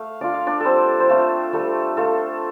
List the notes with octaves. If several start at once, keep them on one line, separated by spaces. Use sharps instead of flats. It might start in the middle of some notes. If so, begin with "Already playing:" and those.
Already playing: A3 F5
D4 F4 D5
F5
D4 D5
G3 C4 A4 C5
C5
A3 C4 F4 A4
G3 A3 A4
A3 F4 A4